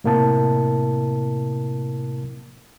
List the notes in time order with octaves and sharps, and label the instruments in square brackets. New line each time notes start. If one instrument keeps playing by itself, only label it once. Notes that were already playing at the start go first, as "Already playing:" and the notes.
[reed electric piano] A2 C3 A#3 E4 A#4 A5